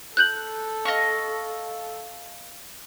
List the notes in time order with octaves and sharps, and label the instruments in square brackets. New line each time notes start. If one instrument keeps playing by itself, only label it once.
[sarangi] A4 [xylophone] F#6 G6 F#7
[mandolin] D#5 F5 C#6